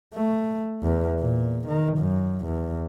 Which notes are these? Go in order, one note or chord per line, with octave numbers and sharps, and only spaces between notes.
A3
E2
A#2
D#3
F#2
E2